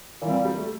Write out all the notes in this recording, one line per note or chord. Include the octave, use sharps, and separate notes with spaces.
A#2 E3 G3 C4
G3
A3